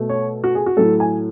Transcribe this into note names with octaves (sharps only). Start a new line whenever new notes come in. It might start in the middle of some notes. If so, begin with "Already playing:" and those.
Already playing: B2 A3
C#5
F#4
G#4
F#4
A2 F#3 A3 A4
G#5